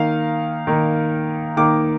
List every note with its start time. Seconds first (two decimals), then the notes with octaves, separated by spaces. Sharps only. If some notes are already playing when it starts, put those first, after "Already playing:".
Already playing: D#3 A#3 D#4 F5
0.67 D#3 A#3 D#4
1.57 D#3 A#3 D#4 D6